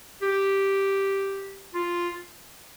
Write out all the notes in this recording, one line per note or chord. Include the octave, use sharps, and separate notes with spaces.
G4
F4